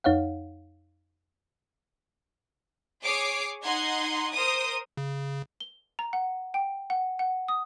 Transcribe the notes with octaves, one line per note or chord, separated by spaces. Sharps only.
F2 D#4 C#5 F5 F#5
G#4 C#5 D6 C7 D7
D#4 F#5 C6 G#6
A#4 C5 D#6
C#3
G7
A#5
F#5
G5
F#5
F#5
D#6